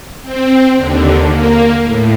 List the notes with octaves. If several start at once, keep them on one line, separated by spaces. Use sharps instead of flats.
C4
D#2 D3
A#3
A2